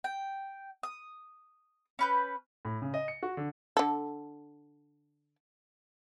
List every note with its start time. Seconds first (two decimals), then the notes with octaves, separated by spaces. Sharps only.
0.04 G5
0.83 D#6
1.99 C#4 B4 G6
2.65 A2
2.82 C#3
2.94 D#5
3.08 C#7
3.23 F#4
3.37 D3
3.77 D3 A4